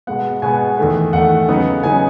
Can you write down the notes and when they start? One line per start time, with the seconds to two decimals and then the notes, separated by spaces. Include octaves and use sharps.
0.07 B2 G#3 B3 F#5
0.42 B2 G#3 B3 G#5
0.78 E2 D#3 A3
1.13 E2 D#3 A3 F#5
1.48 C#3 F#3 B3 D#4
1.83 C#3 F#3 B3 D#4 G#5